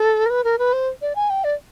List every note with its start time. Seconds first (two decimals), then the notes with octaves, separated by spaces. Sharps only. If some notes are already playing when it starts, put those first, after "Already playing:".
Already playing: A4
0.26 A#4
0.30 B4
0.44 A#4
0.58 B4
0.73 C5
1.02 D5
1.15 G#5
1.30 G5
1.44 D5